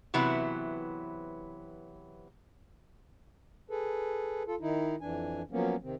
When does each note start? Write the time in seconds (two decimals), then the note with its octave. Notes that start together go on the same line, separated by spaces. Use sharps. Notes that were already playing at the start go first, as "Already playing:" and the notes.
0.14 C3 E3 F#3 B3 E4
3.70 G#4 A4 B4
4.47 F4 A4
4.61 D#3 D#4 E4
5.01 F2 E3 D4 G#5
5.51 F3 F#3 A#3 B3 C#4
5.83 C3 D#3 C4